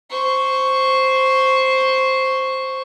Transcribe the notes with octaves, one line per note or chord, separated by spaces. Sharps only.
C5 C#6